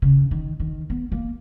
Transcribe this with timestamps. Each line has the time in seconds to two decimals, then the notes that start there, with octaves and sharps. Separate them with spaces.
0.02 C#3
0.31 D#3
0.60 D#3
0.90 B3
1.12 A#3